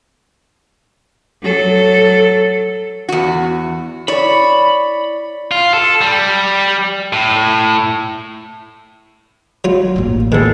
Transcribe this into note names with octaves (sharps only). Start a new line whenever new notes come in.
F#3 A4
E2 F#4
E4 C#5 D5 B5
F4
A4
G3
A2
F#3 F4
A1 A#3
E2 D#3 G#3 A4